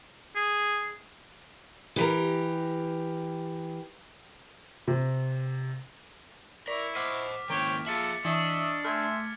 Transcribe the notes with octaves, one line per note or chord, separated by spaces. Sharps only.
G#4
E3 G4 A#4
C3
E4 A#4 D5 C#6 B6
C5 D#5 F#5 D6 F6 B6
D#3 A#3 C#4 E4 C5 C#5 G5
F4 G#4 A4 E5 A6 C#7 F#7
E3 D4 D#5 E5 C#6
A3 E5 G#5 C6 F6 G#6